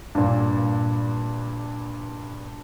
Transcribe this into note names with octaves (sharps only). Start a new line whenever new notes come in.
G2 A#2